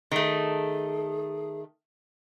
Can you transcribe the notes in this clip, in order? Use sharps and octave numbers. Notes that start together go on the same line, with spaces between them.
D#3 A3 G#4